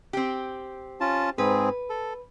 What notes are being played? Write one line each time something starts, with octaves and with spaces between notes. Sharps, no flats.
C4 G4
C#4 F4 A5
G#2 C4 G#4 B4
A4